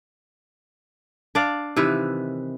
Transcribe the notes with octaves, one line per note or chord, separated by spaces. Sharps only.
D4 D5 F5
C3 D#3 E3 B4